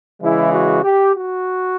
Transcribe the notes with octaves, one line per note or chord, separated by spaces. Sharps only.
C#3 E3 G#3 E4
F#4
G4
F#4